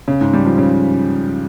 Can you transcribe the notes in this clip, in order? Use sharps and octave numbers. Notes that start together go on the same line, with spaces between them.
C#3
G#2
G3
F3
C#3